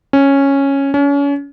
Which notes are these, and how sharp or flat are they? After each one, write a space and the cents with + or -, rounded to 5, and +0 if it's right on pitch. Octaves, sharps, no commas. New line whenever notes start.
C#4 -5
C#4 +35